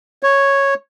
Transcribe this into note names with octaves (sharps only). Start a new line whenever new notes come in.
C#5